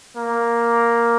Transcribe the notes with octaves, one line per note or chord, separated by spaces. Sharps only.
A#3